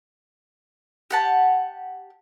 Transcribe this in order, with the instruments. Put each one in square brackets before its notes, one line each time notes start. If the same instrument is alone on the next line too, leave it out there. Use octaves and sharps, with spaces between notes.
[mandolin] G4 F#5 A5